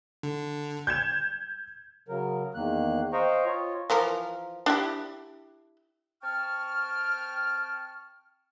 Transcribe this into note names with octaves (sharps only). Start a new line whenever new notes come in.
D3
G6 G#6 E7
C#3 F#3 A#4
E2 D#3 A#3 F#6
C5 D#5 F5 G5 A#5 C#6
F4 C#5
E3 F3 A#4
D4 E4 G4
C4 G5 A5 C#6 F6